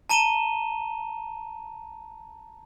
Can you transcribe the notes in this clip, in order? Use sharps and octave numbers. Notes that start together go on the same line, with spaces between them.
A5 A#5 D#7 E7 G7